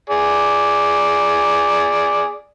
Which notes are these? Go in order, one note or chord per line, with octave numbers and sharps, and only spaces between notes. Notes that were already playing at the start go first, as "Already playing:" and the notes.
G#4 D5